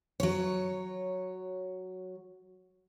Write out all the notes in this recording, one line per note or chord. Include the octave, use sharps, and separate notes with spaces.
F#3 C#5